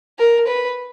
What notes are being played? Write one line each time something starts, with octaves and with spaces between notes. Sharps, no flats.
A#4
B4